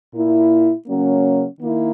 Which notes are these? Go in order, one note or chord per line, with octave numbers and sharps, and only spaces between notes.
A#2 A#3 E4
C#3 F#3 A#3 C#4
D#3 A#3 E4